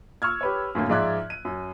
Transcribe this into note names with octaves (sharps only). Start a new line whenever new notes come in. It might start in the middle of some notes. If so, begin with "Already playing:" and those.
C#6 E6 F6 G#6
G4 B4 C#5
F#2 A2 D3 A#3
G#2 F3 D5 E5 F#6 G#6
D#7
F#2